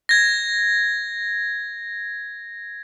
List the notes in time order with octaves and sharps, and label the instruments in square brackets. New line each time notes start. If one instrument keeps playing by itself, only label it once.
[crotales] G#6 A#6